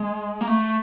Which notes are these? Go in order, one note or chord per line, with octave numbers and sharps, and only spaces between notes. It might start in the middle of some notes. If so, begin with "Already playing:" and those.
Already playing: G#3
A#3
A3